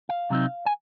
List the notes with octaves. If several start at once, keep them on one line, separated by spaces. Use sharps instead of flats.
F5
C3 F#3 C4 D#4
G#5